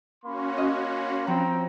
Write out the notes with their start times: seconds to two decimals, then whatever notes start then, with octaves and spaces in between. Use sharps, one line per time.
0.25 A#3 C#4 F#4 B5 C6
0.57 D#5
1.27 F3 C4 G5 A#5